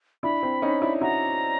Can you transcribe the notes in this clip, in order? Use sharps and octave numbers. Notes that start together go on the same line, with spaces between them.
D4 E4 B5
C4 D4
C#4 D#4
D4 E4
E4 F#4 A#5